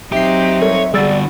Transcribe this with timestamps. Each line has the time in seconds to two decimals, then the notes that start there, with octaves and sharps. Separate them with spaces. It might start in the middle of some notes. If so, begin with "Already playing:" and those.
0.12 B1 F#3 C4 D#4 G4 E5 C7
0.62 G3 A4 A#4 C#5
0.94 D3 G3 F#4 G#4 D5 E6 A6